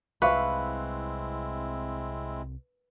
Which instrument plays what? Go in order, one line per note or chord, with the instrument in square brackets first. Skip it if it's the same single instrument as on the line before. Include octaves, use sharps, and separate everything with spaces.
[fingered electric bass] C2 [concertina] G#3 C4 E4 [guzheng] B4 [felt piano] E5 F5 C#6